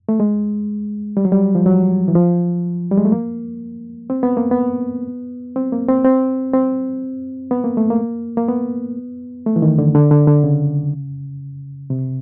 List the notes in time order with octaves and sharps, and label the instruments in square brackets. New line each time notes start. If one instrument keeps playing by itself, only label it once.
[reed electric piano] A3
G#3
G3
F#3
G3
F3
F#3
E3
F3
G3
G#3
A3
A#3
C4
B3
A#3
B3
C4
A#3
C4
C4
C4
B3
A#3
A3
A#3
A#3
B3
A3
E3
D#3
D3
D3
D3
D3
C#3
C3